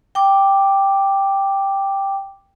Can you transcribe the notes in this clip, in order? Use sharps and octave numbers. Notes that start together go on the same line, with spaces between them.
G5 D6